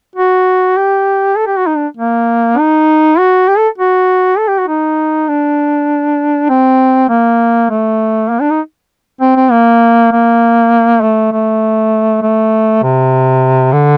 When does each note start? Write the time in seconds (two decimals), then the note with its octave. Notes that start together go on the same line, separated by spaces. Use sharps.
0.16 F#4
0.77 G4
1.37 A4
1.47 G4
1.57 F#4
1.67 D#4
1.76 D4
1.97 A#3
2.58 D#4
3.18 F#4
3.48 G4
3.58 A4
3.78 F#4
4.38 A4
4.48 G4
4.59 F#4
4.68 D#4
5.28 D4
6.50 C4
7.10 A#3
7.70 A3
8.30 A#3
8.41 D4
8.50 D#4
9.21 C4
9.36 C4
9.51 A#3
10.11 A#3
11.01 A3
11.32 A3
12.22 A3
12.83 C3
13.73 D3